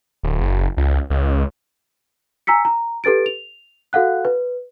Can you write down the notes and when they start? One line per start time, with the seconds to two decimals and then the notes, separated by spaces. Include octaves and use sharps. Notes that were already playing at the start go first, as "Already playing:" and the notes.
0.23 D1
0.41 F#1
0.77 C#2
1.10 C#2
2.47 G#5 A#5 E6 B6 C#7
2.65 A#5
3.04 G4 A4 B4 A6 D7
3.26 F7
3.93 F#4 A4 F5 F#5 F#6
4.25 B4